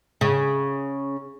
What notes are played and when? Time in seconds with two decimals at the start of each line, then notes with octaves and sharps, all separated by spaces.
0.21 C#3